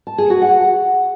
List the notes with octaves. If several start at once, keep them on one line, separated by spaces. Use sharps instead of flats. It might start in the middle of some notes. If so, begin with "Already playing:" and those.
A5
G#4
F#4
F#5